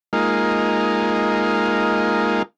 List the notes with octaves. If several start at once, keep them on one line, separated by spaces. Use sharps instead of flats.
G#3 A#3 D#4 F4